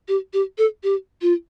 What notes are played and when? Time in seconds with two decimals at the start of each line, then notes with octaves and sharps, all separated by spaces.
0.08 G4
0.33 G4
0.58 A4
0.83 G4
1.22 F4